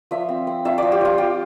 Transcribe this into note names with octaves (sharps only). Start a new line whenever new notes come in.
F3 E5
C4
C4
F4 E5
F3 D5
G4
F3 F4
F3 G4